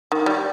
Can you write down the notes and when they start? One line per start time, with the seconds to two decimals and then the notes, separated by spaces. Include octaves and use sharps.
0.12 D#3
0.26 G3